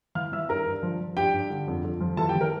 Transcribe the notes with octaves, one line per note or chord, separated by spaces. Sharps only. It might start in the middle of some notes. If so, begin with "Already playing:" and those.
E3 F5 F6
E3 E5 E6
G2 A#4 A#5
G2
F3
F3
G2 G4 G5
G2
D3
F2
F2
F3
E3 A4 A5
G4 G5
E3
A#4